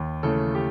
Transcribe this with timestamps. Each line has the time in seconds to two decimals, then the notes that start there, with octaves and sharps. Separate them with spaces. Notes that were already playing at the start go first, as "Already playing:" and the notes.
Already playing: D#2
0.23 C#3 E3 A3 A4
0.55 G4